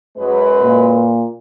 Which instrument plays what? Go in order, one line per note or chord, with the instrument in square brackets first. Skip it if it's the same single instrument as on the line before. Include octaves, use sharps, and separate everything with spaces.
[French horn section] F#2 G#3 B4
[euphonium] A#2